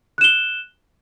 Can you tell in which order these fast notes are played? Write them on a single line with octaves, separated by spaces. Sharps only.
F#6 E7 G7